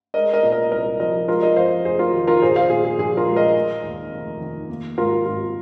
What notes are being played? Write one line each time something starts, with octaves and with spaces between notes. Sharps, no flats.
G#3 A#4 D#5
A#4 D#5
A#2
A#4 D#5
C2 A#4 D#5
F3 A#4 D#5
G#3 F4 A#4
A#4 D#5
F2 C5 F5
F1 G#4 C5
F4 A#4
D#3
F4 A#4
A#1 G#4 C5
C5 F5
A#2 G#4
G#4
A#1 G#4
F4 A#4
G#3
A#4 D#5
G#3
D#2
F1
D#3
A#3
G#2 F4 A#4
G#1 F4